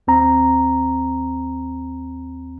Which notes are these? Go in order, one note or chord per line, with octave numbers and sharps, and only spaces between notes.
D#2 C4 A#5